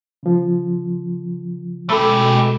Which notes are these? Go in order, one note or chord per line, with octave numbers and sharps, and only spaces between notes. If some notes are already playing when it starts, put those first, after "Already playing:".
C#3 F3
B2 G#3 A3 G4 A4 B5 E6